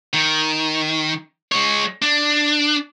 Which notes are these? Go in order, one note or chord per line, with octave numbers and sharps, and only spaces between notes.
D#3
G#3 C#5
D4